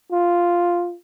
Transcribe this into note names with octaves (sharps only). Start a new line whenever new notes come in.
F4